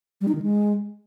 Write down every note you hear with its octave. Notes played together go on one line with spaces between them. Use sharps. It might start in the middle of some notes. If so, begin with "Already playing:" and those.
G3
D#4
D#3
G#3